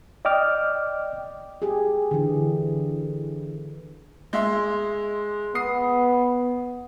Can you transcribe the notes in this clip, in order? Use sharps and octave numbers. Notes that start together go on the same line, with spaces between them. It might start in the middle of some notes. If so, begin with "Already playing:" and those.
D5 D#5 G5 D6 F6
G4 G#4
D3 E3
G#3 E5 C6
B3 D#6 C7